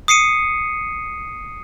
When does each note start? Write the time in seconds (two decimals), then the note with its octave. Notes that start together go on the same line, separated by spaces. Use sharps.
0.08 D#6 C7 C#7 D#7